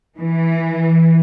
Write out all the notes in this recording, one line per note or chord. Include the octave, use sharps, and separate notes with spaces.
E3